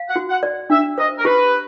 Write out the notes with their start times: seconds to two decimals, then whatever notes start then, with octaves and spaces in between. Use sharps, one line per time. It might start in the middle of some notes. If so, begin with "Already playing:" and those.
Already playing: F5
0.09 F#5
0.16 F#4
0.29 F#5
0.43 D5
0.70 D4 E5
0.98 C5 D#5
1.18 A#4
1.25 G4 B4